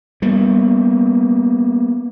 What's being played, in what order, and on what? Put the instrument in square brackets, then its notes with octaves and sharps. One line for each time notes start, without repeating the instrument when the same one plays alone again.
[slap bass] G3 A#3 B3